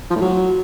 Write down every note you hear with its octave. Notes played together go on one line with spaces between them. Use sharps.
F3
A2
F#3